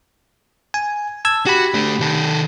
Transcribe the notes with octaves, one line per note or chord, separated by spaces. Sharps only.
G#5
A5 E6 G#6
F#4 G4 B5
A3 D4
D#3 A4